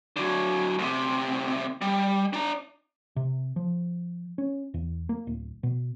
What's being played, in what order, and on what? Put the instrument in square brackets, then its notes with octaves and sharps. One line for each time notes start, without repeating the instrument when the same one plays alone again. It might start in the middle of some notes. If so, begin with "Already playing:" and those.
[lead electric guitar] D3 F#3
D2 C3
G3
D4 A#5
[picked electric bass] C3
F3
C#4
E2
A#3
D1
B2